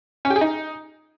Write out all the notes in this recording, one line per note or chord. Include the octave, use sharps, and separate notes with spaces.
C#4
G4
G#4
D#4